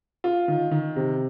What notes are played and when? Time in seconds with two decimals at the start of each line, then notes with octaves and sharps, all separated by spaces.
0.24 F4
0.48 D#3
0.71 D#3
0.96 C3